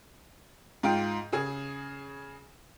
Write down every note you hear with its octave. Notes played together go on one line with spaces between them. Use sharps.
G#2 F4 G5
C#3 G#4